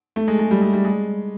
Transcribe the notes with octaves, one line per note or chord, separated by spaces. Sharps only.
A3
G#3
G#3
G3
G#3
G3
G#3